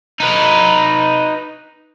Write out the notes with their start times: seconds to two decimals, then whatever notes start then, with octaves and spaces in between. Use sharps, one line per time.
0.20 D#4 B4